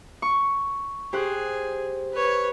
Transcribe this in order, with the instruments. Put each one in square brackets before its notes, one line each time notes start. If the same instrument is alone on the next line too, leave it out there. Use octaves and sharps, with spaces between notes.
[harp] C#6
[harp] G4 C5 F#6 [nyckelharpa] G#4
[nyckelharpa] B4 C#5